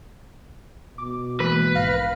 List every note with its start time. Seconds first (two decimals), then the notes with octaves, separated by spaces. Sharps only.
0.98 B2 D6
1.40 E3 G#3 A#3 B4
1.76 A#1 G#2 F5 A#6